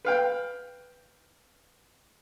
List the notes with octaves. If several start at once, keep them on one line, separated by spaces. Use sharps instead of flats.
B4 F5 G5